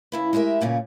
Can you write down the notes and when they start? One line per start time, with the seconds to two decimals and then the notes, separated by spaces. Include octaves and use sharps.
0.12 C#3 E4 B4
0.33 G#3 E4 G4 A#4 E5
0.61 G2 A#2 C#3 C#4